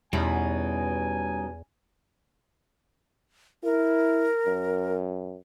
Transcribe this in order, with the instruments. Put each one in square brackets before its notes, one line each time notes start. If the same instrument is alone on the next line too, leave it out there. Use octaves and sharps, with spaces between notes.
[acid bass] E2 [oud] B2 E4 [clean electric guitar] G3 C#4 D#4 [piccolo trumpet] G#5
[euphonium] E4 [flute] A#4
[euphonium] F#2